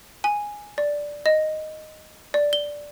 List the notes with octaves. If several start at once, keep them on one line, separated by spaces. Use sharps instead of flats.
G#5
D5
D#5
D5
G7